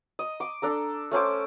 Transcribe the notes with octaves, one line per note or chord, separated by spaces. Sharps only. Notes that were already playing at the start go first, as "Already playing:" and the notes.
D#5
D6
D4 A4 A#5
A3 C#4 C5 D6